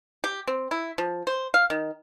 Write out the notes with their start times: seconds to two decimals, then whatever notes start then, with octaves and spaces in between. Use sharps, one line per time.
0.24 G4
0.47 C4
0.71 E4
0.98 F3
1.27 C5
1.54 F5
1.70 D#3